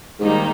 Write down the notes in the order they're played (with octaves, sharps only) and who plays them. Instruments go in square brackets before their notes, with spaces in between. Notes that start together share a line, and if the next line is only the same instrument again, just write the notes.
[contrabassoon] G#2 [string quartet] D#3 G3 A#3 D#4